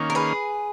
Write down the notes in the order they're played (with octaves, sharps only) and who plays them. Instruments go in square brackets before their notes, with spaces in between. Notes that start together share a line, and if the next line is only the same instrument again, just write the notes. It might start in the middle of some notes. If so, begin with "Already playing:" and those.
Already playing: [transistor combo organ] D#3 A#3 C#4
[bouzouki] A#4
G#4 B4